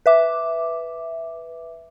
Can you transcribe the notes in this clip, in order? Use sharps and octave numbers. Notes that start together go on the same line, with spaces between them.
B4 E5 D6